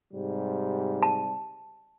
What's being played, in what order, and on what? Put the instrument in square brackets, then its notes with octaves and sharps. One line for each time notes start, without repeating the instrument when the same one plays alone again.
[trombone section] G#2 C3 G3
[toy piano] A5